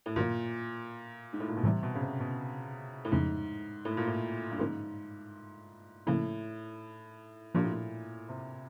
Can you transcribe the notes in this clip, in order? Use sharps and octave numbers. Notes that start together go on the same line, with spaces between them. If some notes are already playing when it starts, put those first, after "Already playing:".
A2
G2 A#2 D#3 F#3
G#2
A2
A#2
B2
A2 C3 E3 G3
B2
C#3
C3
B2
A2
F2 G#2 C#3 F3 A3 C#4
A2
A#2
A2
G2
G#2 D3 F3 A#3 C#4
A2 C#3 F3 A#3 C#4 E4
A#2 F3 A#3 D4 G4
A2
A#2
C3